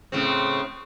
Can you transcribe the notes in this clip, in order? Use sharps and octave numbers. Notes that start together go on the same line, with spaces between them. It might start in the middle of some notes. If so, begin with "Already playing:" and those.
A2 C#3 C4